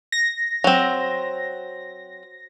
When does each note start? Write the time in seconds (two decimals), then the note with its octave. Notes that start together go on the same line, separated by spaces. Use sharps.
0.12 A#6
0.64 F#3 C4